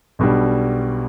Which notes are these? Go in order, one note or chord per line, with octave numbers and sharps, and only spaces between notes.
B1 B2 G3 D4